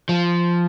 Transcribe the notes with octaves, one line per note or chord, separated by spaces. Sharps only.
F3